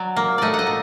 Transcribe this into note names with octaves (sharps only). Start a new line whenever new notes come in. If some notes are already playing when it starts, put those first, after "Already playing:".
Already playing: F#3 D5
A#3
A3 D5 D#5
F#5
D#5
A#2